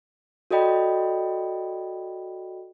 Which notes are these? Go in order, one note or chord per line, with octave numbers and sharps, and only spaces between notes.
F#4 A4 D5 D#5 G5 B5